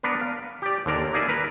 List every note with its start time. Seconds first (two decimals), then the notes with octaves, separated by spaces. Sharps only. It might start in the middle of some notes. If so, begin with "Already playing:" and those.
0.03 B3 D4 A#4 B4
0.21 F5
0.62 G4 D5
0.86 D#2 D3 A#4 D5
1.13 A#3 D#4 G#4 D5 E5
1.29 A#4 B4